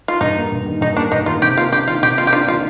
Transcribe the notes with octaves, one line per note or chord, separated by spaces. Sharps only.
F4
G2 D#4
A#3
G2
D#3
G2 D#4
A#3 D4
G2 D#4
D#3 F4
C3 G4
A#3 F4
D4 G4
D#3 F4
C3 G4
A#3 F4
G4
D4 F4
D#3 F4